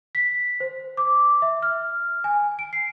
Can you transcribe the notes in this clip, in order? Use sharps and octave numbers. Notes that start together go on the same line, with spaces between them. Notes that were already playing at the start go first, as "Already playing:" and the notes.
B6
C5
D6
E5
F6
G#5
D7
C7